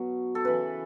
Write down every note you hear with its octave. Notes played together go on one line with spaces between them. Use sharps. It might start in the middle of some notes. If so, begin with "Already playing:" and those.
Already playing: B2 F#3
A4
C#3 E3 B4